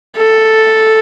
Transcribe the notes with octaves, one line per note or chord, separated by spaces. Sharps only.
A4